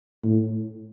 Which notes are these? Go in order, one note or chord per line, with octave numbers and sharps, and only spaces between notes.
A2